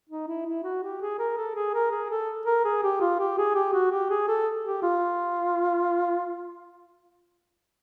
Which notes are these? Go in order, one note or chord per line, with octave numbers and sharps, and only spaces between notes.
D#4
E4
E4
F#4
G4
G#4
A#4
A4
G#4
A#4
G#4
A4
A#4
G#4
G4
F4
G4
G#4
G4
F#4
G4
G#4
A4
G4
F4